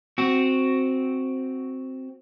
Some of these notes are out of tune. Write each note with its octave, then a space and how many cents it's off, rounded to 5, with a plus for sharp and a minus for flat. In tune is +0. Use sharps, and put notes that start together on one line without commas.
C4 +0 F#4 +0